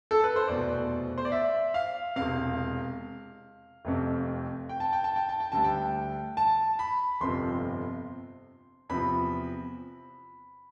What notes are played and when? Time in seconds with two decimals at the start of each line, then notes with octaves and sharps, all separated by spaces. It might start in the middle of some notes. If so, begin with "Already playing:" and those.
0.11 A4
0.24 B4
0.36 C5
0.48 F1 E2 B2 D5
1.18 C5
1.25 D5
1.32 E5
1.74 F5
2.16 E1 E2 C3 F5
3.85 F1 F2 C3
4.69 G5
4.80 A5
4.93 G5
5.04 A5
5.16 G5
5.29 A5
5.40 G5
5.52 D2 D3 G3 A5
5.64 G5
6.37 A5
6.79 B5
7.21 G1 F2 C3 F3 C6
8.89 E2 C3 F3 B5